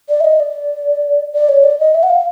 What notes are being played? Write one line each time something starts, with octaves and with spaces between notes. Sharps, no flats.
D5
E5
D#5
D5
D5
C#5
D5
D#5
E5
F#5
F5